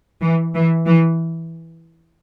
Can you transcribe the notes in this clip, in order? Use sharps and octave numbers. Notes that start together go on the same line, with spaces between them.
E3
E3
E3